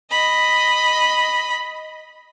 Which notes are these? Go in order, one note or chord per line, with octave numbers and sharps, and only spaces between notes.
D#5 B5